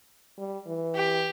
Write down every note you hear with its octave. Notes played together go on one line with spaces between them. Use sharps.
G3
E3
G4